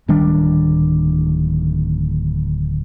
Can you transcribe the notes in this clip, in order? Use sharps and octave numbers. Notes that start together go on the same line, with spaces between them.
D1 D#3 G3 D4